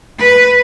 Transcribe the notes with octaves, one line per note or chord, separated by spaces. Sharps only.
B4